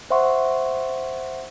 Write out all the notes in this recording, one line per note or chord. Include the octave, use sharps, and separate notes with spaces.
C5 E5 F#5 C6 C#6